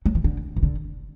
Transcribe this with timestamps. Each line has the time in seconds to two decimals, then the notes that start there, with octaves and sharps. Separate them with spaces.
0.06 F#3
0.15 E3
0.24 D3
0.57 E3
0.63 D3